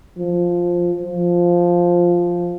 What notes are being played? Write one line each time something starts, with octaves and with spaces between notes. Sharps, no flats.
F3
F3